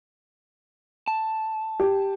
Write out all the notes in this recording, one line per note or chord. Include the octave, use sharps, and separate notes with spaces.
A5
G4